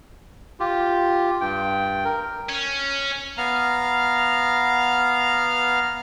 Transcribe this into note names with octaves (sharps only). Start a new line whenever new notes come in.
F4 G4
G2 G5
A#4
C#4
B3 F5 A#5 F6